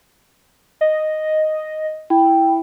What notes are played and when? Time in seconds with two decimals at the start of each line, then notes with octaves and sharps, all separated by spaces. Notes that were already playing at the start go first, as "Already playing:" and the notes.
0.81 D#5
2.10 E4 G5